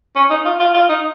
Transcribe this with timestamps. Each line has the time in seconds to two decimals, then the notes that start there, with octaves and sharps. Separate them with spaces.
0.16 C#4
0.30 D#4
0.45 F4
0.60 F4
0.74 F4
0.89 D#4